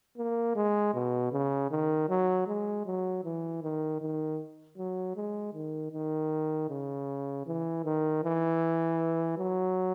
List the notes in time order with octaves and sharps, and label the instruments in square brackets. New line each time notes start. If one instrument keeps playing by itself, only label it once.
[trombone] A#3
G#3
B2
C#3
D#3
F#3
G#3
F#3
E3
D#3
D#3
F#3
G#3
D#3
D#3
C#3
E3
D#3
E3
F#3